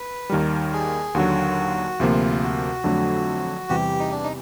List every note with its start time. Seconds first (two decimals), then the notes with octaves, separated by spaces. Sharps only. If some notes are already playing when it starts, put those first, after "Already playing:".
Already playing: B4
0.30 D#2 D#3 G3 A#4
0.73 G#4
1.15 D#2 D3 F#3 F#4
2.00 D2 C3 F3 A#3 F4
2.42 F#4
2.84 F2 D3 F#3 A3
3.69 E2 C3 E3 G3 G4
4.00 D#4
4.11 D4
4.24 D#4